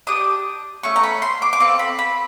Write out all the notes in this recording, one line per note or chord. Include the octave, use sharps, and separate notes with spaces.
D4 G4 D#6
A3 C#4 C#6
A#5
B5
C6
D6
D6
C4 F4 A4 C#6
B5
B5